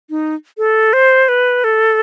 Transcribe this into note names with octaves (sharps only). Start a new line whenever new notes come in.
D#4
A4
C5
B4
A4